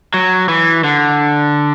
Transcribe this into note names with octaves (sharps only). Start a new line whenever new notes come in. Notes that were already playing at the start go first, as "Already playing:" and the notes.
F#3
E3
D3